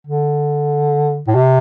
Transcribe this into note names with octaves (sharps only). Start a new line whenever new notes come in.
D3
A2
C3